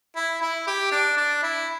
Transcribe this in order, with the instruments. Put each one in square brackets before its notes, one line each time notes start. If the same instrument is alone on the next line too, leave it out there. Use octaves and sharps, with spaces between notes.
[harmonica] E4
E4
G4
D4
D4
E4